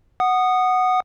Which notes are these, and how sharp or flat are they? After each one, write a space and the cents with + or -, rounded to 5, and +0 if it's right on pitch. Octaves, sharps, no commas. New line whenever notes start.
F#5 +0 D#6 -15